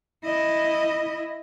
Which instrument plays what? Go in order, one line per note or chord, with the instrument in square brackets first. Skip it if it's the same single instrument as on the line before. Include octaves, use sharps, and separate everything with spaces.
[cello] E4 D#5